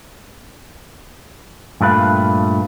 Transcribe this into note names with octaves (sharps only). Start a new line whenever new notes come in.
G2 A#2 A3 B4 F5